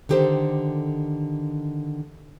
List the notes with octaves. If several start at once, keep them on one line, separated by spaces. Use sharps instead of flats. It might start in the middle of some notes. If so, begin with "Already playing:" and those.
D3 D#3 G4 A4 C5